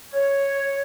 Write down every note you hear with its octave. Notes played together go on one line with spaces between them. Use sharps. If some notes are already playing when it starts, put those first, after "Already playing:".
C#5